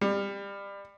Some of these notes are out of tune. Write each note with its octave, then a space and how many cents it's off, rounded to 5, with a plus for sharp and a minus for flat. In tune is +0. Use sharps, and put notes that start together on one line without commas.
G3 +25